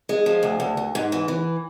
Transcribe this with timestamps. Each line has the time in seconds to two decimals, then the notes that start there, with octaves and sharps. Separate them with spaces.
0.09 G#3
0.26 F3
0.43 D2
0.60 D2
0.77 D2
0.95 G#2
1.12 E3
1.28 E3